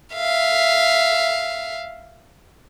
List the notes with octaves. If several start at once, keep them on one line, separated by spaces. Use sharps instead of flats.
E5 F5